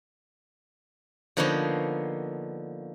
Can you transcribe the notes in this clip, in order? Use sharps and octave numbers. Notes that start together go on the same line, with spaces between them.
D3 F3 A#3 B3 D#4 C#5